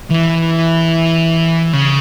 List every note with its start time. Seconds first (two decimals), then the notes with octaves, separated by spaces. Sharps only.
0.10 E3
1.73 C#3